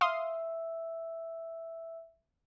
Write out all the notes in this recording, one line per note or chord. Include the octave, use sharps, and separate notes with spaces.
E5 F5 C6 D#6 E6